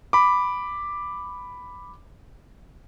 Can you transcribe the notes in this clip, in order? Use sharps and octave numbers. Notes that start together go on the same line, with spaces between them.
B5 D6